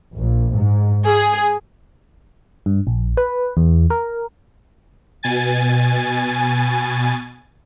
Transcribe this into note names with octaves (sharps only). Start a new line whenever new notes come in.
A#1
G#2
G#4
G2
A#1
B4
E2
A#4
B2 G#5 A6